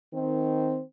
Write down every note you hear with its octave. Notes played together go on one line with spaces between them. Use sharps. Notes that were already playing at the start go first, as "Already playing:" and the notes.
D#3 C4